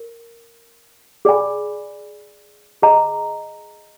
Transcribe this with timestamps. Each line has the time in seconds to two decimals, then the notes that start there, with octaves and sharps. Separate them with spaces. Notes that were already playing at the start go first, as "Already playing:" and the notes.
Already playing: A#4
1.25 G#4 D5 G#5 B5
2.82 G#4 D#5 A#5